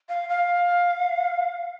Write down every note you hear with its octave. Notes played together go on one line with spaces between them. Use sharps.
F5
F5